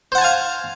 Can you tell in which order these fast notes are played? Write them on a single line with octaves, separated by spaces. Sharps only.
C5 F#5 A5 G#5 F5